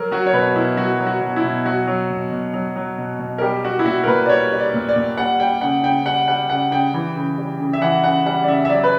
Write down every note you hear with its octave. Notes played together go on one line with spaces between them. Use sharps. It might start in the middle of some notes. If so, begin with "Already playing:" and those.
Already playing: F#3 A#4
F#3 F#4
C#5
B2 B4
B2 E4
F#3 F#4
F#3
F#4
B2
E4
B2
F#3 F#4
F#3
B2
B2
F#3
F#3
B2
B2
A#4
G3 G4
G3 F#4
E4
A#2 F#4
A#4
A#2 B4
D5
G3 C#5
G3
D5
A#2
D5
A#2
G3 F#5
G3 G5
C#3 F#5
C#3 G5
G3 F#5
G3 F#5
C#3 F#5
C#3 G5
E3
C#3
G3
C#3
E5
E3 F#5
C#3 F#5
G3 F#5
D5
C#3 E5
E5
F#3 D5
B4